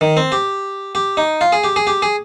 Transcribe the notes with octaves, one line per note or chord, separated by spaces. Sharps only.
D#3
C4
G4
G4
D#4
F4
G#4
G4
G#4
G4
G#4